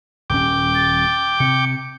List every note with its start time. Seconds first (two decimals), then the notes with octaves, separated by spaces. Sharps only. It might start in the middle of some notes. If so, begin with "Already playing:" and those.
0.30 D#1 C#4 G5 D6
0.75 A6
1.40 C3 C#7